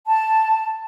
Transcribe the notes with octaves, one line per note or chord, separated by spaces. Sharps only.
A5